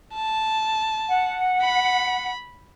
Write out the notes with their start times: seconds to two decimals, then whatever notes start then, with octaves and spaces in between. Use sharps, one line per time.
0.14 A5
1.09 F#5
1.63 B5